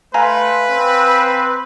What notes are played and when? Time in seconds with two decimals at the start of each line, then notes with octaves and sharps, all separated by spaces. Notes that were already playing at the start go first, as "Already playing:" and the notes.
0.14 A3 B4 F5 G#5 A#5 C6
0.71 C4